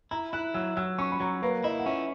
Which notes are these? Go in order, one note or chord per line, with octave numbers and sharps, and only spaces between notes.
E4 A#5
E4 F#6
F#3 E6
F#3 E6
C#4 C#6
B5
F#3 A#5
A#3 B4
E4 D#5
F#5
C#4 E5